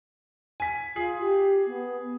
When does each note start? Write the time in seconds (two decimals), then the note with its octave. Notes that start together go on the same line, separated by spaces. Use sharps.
0.60 G#5 B6
0.96 F4 G#4 C7
1.21 G4
1.67 B3